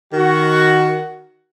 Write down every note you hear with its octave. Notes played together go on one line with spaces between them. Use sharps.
D#3 F#4